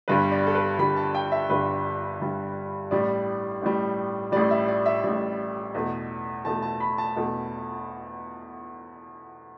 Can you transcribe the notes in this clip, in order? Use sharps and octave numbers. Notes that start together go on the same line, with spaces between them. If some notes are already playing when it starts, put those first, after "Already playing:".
G1 G2 G3 B4
D5
A4
B4
G1 G2 G3 B5
A5
G5
E5
G1 G2 G3 B4
G1 G2 G3
A1 A2 G3 D5
A1 A2 G3
A1 A2 G3 D5
E5
D5
E5
A1 A2 G3
E2 B2 A3
E2 B2 A3 A5
A5
B5
A5
E2 B2 A3